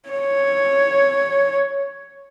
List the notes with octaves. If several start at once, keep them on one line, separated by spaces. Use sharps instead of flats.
C#5